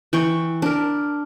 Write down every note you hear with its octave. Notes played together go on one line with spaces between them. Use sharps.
E3 G5 C#6
D4 A#4